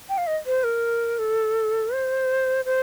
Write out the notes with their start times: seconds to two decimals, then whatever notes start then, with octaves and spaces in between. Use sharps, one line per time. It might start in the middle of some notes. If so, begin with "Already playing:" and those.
0.09 G5
0.18 F5
0.27 D#5
0.46 C5
0.64 A#4
1.18 A4
1.93 C5
2.65 C5